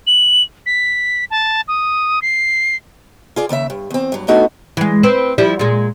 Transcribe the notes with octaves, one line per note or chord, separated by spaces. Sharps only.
F#7
B6
A5
D#6
C7
F4 G#4 D5
D#2 C#3 D#5 E5
G2
E2 C4
G2 F#3
A3 B3 D4 D#4 F#4 A4
E3 G#3
C4 B4 C5
F3 G3 E4
A#2 G#3